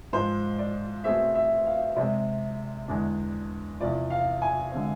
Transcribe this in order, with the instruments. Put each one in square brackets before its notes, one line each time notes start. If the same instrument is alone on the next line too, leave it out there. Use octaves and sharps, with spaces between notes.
[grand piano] G#2 F3 G#3 [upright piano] C5
[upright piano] D5
[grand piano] B2 A3 C4 G#4 [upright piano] E5
[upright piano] E5
F5
[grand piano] C3 G#3 C4 [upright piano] D5
[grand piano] E2 D3 G#3 D4
[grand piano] E2 C3 F3 [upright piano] D5
[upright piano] F5
G#5
[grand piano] D3 G#3 C4